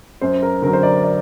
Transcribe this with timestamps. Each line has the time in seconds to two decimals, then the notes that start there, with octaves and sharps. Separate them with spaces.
0.21 F#2 C5
0.43 A#4
0.62 D3 F#3 A#4
0.73 C5
0.83 D5
1.04 D5